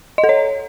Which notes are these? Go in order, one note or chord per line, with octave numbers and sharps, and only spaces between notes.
D#5
A4
C#5